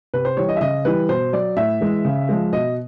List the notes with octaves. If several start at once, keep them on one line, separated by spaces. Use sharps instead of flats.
C3 B4
C5
E3 G3 C#5
D#5
E5
C#3 D#5
E3 G3 B4
B2 C5
F#3 D5
A2 E5
E3 G#3
C#3
F3 G#3
B2 D#5